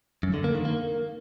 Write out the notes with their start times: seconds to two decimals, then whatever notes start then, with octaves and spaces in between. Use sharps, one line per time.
0.23 F#2
0.34 D3
0.44 A#3
0.55 D#3
0.65 A#3